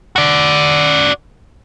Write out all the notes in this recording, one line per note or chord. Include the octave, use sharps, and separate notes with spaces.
F#4 D5